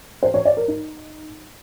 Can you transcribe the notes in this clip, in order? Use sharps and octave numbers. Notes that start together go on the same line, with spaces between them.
C5
C#5
D5
A#4
D#4